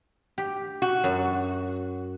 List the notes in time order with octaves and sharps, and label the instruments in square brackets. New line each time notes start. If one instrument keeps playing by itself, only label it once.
[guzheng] G4
[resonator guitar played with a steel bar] F#4
[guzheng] F#2